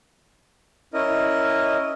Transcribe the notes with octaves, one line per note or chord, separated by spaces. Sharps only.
C#4 E4 A#4 D#5